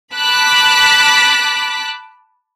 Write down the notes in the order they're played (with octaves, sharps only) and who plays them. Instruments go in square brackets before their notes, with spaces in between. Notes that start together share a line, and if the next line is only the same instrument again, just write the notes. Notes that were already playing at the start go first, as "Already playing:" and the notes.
[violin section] A5 B5 D6 F#6 B6